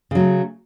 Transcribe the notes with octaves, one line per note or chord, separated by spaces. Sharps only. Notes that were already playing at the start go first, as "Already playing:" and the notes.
C#3 F#3 A3